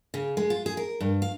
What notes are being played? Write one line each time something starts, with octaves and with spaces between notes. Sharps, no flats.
C#3
G#3
F4
G#4
A#4
G2
F5